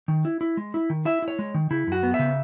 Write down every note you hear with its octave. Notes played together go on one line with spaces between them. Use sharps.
D#3
E4
E4
G#3
E4
D#3
E4 E5
E4
C#5
G#3
D#3
C#3 E4
F#2 F#4
B3
E5
C#3